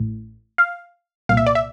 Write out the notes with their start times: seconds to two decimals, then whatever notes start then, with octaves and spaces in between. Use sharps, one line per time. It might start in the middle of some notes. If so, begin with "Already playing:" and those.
Already playing: A1 A2
0.58 F5
1.29 C2 A#2 F5
1.37 E5
1.47 D5
1.55 E5